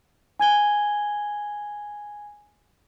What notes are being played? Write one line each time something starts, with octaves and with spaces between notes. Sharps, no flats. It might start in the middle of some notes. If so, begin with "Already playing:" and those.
G#5 G#6 G7